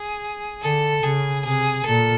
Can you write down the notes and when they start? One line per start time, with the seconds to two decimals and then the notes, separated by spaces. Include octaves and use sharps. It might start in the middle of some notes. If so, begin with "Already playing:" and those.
Already playing: G#4
0.62 D3 A4
1.03 C#3 G#4
1.45 C3 G#4
1.85 A#2 A4